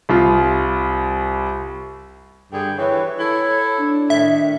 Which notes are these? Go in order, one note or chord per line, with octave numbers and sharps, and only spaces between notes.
C2 F4
G2 D3 G#4 G5
E3 C#5
E4 A4
D4
A2 D#3 E5